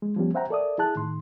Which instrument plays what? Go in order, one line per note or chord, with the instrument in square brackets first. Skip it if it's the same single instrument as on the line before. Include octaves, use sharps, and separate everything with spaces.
[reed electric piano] G#3
F3 G3 B3 C#4 G4
C5 E5 F#5 G5 A#5
A4 A#4 D5 E5 D#6
E4 G#4 A5 F#6
A2 D#3 C6